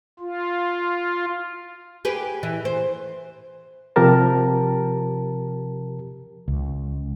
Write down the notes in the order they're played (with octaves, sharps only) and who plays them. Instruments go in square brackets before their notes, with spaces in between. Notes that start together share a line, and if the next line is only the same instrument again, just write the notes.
[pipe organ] F4
[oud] G4 G#4 B4
E3
C5
[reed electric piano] C3 F3 G4 A#4 A5
[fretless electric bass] C#2